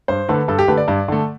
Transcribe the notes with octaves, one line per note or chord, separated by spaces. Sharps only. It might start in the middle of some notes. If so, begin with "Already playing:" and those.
G2 C5
D3 A3 B4
G2 A4
G4
D3 A3 B4
D5
G2
D3 A3